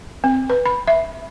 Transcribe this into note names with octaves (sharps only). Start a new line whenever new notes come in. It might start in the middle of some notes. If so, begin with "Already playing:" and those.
C4
B4
B5
E5